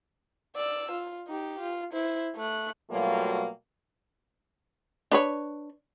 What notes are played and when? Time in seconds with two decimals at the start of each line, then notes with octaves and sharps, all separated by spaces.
0.56 D5 E6
0.92 F4
1.28 D#4 G4
1.60 F4
1.92 E4 C5
2.36 A3 F#6
2.90 B2 F#3 G3 A3 A#3 F4
5.12 D4 B4 C#5